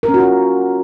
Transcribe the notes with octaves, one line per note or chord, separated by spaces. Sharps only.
A#4
C#4
F#4
F4